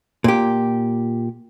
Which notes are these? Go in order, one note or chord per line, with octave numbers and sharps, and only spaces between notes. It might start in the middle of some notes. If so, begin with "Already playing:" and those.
A#2 G4